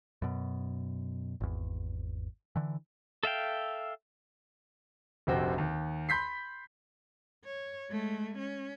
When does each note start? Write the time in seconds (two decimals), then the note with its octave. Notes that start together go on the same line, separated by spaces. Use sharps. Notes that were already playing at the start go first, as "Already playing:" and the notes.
0.22 F#2 B2
1.41 G#1 E2
2.56 D3 E3
3.23 A4 E5 F5 G5
5.27 F1 A#1 C3 C4 F#4 G5
5.58 D#2
6.09 B5 C6 G6 B6 C7
7.45 C#5
7.91 G#3 A3
8.38 C#4